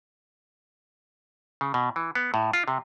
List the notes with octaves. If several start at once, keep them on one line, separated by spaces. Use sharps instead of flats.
C#3
B2
E3
B3
A2
F4
C3